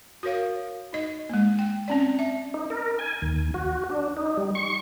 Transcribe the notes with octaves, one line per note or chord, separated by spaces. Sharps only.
F#4 A#4 C#5 F5
D#4 D#5
G#3 A#3
G5
C4 C#4 D5
E5
D#4
A#4
G#5
D#2
F#4
D4
D#4
G3
C#6